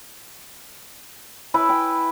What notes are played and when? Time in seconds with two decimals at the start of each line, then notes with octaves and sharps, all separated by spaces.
1.54 E4 B4 E5 G#5
1.69 G5